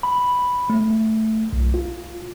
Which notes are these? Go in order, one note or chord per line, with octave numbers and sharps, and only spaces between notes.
B5
A3
B1
F4